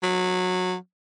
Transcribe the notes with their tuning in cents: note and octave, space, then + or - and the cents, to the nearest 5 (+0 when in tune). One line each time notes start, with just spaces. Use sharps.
F#3 -20